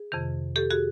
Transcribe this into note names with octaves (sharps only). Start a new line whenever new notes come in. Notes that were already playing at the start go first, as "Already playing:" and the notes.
Already playing: G#4
F2 C3 D#3
G4 A4
F#4 G#4